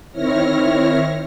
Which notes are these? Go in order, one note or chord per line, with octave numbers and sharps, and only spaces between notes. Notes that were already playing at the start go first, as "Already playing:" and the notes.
D#3 C4 E4 C#5 F6 A#6